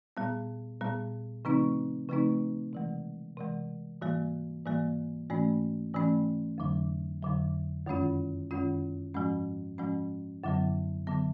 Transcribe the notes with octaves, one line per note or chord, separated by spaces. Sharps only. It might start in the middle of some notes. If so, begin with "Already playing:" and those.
A#2 G3 B3
A#2 G3 B3
C#3 F3 A3 C4 D#4
C#3 F3 A3 C4 D#4
C3 E3 G#3
C3 E3 G#3
G#2 E3 G3 A#3
G#2 E3 G3 A#3
G#2 E3 A3 C#4
G#2 E3 A3 C#4
F2 D3 F#3
F2 D3 F#3
F#2 D#3 G#3 C#4 F4
F#2 D#3 G#3 C#4 F4
G#2 F3 G#3 C#4
G#2 F3 G#3 C#4
F#2 D3 F#3 B3
D3 F#3 B3